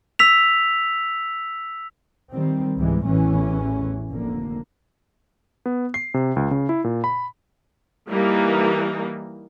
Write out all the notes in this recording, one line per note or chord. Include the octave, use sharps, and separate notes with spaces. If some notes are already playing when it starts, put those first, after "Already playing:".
E6 B6 F7
D#3 G3 C4
C#2 G#2 E3 G3 G#3
A1 E2 A2 E3 C#4
F1 D3 A#3
B3
C7
C3
C#2
C#3
E4
A#2
B5
E3 G3 A#3 D#4